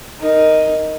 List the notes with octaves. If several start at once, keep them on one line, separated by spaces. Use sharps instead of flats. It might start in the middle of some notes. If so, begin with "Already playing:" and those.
D#4 A#4